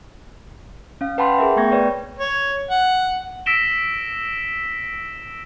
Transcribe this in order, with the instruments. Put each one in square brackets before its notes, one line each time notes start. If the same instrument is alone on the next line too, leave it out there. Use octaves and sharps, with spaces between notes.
[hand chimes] C#4 F5
B4 F#5 G5 A5 B5 C6
G#4 A#4 E5
A3 B3 G5 C#6 G#6 A#6
B4 C#5 D5
[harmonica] C#5
F#5
[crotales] E6 A#6 B6 D7 E7 G7